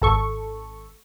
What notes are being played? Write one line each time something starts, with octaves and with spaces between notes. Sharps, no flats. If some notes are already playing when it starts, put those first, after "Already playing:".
G#1 A4 C#6